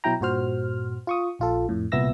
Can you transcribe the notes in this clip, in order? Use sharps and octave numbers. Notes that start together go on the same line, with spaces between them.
B2 F#3 E4 G5 A#5
G2 A#2 F#4 C5 F6
F4 C#6 D#6
A#1 F4 A4
F2 A2
C2 A#2 B3 E5 E6 A#6